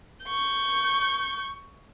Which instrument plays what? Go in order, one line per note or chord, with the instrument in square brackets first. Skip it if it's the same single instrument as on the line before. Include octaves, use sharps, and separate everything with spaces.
[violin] C#6 G6